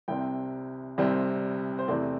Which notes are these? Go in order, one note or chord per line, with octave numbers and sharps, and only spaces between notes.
C2 C3 G3 C4 G5
C2 C3 G3 C4
C5
E2 C3 A3 C4 D5